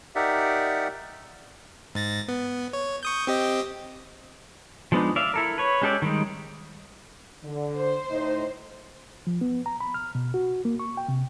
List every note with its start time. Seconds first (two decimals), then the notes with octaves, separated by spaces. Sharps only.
0.15 D#4 G4 A#4 D5 E5 F#5
1.95 G#2 A6 A#6
2.28 B3
2.73 C#5
3.03 C#6 D#6 G6
3.27 C4 G4 D#5
4.92 F3 G#3 B3 D4 D#4
5.16 D5 E5 F5
5.34 E4 A4 A#4
5.58 B4 C#5
5.82 G#3 C#4 G4 A4 D5
6.02 D#3 G3 G#3
7.43 D3
7.78 C5
8.10 A2 D#4 D#5
9.27 F3
9.41 B3
9.66 A#5
9.80 B5
9.94 F6
10.15 B2
10.34 F#4
10.65 A#3
10.80 C#6
10.97 G5
11.09 C3